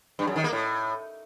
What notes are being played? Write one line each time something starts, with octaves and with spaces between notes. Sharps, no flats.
G2
F#2
D#3
A#3
A2